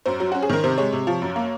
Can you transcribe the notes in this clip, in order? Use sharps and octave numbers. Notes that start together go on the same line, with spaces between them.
F#2 C5
F#3
C#4 F#4
G#4
D#3 A#4
C3 C5
G#3 C#5
C3
F3
F#2
A#3